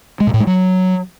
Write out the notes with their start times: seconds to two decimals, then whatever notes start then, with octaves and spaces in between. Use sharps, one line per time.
0.20 G#3
0.27 A#2
0.34 A2
0.40 G#3
0.47 F#3